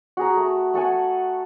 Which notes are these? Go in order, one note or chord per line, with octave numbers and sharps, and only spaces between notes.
F#4 G#4 A#5
A3
A3 A4 F#5 G#5